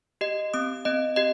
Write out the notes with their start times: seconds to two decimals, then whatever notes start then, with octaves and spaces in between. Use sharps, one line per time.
0.21 G4 D#5
0.54 C4 D#6
0.85 C4 D#5
1.16 G4 D#5